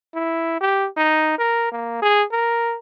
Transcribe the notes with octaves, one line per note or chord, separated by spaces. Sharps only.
E4
G4
D#4
A#4
A#3
G#4
A#4